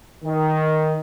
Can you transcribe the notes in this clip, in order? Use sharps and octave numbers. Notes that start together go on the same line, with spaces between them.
D#3